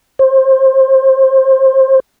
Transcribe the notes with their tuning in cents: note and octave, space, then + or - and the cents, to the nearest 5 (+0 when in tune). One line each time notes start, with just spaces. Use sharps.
C5 +25